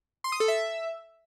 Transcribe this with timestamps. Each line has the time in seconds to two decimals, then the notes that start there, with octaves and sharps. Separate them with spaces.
0.24 C6
0.32 D#6
0.40 A4
0.48 E5